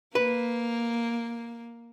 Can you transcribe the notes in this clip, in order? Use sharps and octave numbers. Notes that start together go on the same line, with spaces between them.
A#3 B4